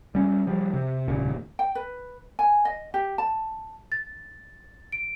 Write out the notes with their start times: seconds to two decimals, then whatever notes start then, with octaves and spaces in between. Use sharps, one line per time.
0.15 G3 C#4
0.47 F3 G3
0.73 C3
1.08 F1 D#2 A#2 C#3
1.59 G5
1.75 B4
2.39 G#5
2.65 D#5
2.94 G4
3.18 A5
3.92 A6
4.92 D7